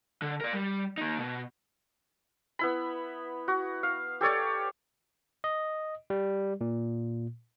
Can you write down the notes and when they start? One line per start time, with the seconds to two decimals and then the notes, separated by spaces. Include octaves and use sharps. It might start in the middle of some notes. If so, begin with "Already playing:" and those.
0.22 D3
0.41 A#4 D5
0.53 G3
0.98 A#3 D#4
1.19 B2
2.59 B3 E4 B5
3.48 F#4
3.83 F5
4.21 G4 A4 C#5 D5
5.44 D#5
6.10 G3
6.61 A#2